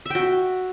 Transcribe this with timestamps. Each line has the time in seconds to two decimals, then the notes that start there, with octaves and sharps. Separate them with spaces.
0.06 E5
0.10 G5
0.15 F#4